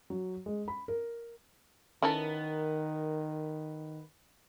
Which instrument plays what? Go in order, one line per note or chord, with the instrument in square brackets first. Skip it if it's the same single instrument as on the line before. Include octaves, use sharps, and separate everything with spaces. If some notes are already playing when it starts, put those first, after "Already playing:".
[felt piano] F#3
G#3
B5
A#4
[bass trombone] D#3 [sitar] B3 A#4 [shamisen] C#4 E4 A4